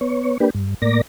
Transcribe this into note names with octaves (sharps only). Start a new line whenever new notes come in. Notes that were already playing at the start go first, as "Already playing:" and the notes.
B3 C#5
A#3 D4 G4 B4
G2
A2 A#3 D5 A#6